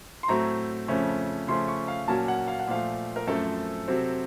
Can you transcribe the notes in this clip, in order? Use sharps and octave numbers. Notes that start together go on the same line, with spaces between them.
C6
A2 F#3 A3 C4 A#5
F2 C#3 F3 A3 C#4
C#3 F3 A3 C#4 C6
C#6
F5
A#2 F#3 A#3 C#4 A5
F#5
F5
F#5
A#2 F3 A3 F5
A#4
F#2 F3 A3 C4 A4
C3 F#3 C4